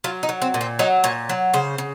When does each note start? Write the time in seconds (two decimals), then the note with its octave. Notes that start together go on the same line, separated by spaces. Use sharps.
0.04 F#3 F4
0.23 D#4
0.29 F#3
0.42 C4
0.54 A#2
0.61 C4
0.79 F#3 D#4
1.04 A#2 C#5
1.29 F#3
1.54 C#3 C5
1.78 C#3